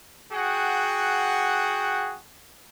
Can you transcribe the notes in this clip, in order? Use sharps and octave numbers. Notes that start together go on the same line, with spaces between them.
F#4 G#4 F#5 G5